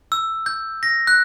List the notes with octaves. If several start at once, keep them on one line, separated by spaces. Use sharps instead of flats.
E6
G6
A#6
F#6